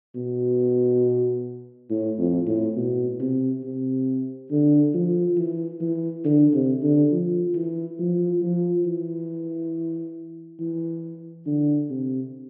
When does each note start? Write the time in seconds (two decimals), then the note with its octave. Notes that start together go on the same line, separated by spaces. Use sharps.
0.15 B2
1.90 A2
2.18 F2
2.47 A2
2.76 B2
3.20 C3
3.64 C3
4.51 D3
4.94 F3
5.38 E3
5.81 E3
6.25 D3
6.54 C3
6.83 D3
7.12 F3
7.55 E3
7.99 F3
8.42 F3
8.86 E3
10.60 E3
11.46 D3
11.90 C3